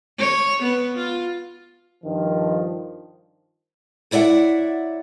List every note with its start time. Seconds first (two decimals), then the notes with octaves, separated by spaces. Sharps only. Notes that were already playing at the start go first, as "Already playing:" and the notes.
0.18 C#5
0.63 B3
0.96 F4
2.04 G2 D#3 F3
4.11 F#3 E4 D5 E5 F#5